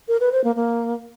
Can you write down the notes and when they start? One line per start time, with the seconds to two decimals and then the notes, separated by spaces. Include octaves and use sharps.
0.08 A#4
0.20 B4
0.32 C5
0.44 A#3
0.56 A#3